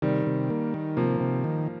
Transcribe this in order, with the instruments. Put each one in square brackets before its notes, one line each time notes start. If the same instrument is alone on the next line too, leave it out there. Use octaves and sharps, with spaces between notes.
[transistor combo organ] C3 [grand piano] D#3 G3
[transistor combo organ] C3
A#3
D#3
[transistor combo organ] C3 [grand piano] F3 A#3
[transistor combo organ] C3
D#3